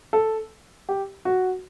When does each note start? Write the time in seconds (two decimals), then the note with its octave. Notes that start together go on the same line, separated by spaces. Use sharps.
0.13 A4
0.89 G4
1.25 F#4